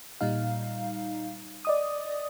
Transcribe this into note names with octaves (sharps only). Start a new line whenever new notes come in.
A#2 G3 D#4 F5
D5 D#5 D#6